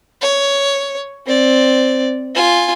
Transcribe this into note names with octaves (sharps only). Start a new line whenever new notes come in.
C#5
C4 D5
F4 G#5